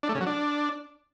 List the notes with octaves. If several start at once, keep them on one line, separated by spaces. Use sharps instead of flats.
D4
A3
C#3
F#3
D4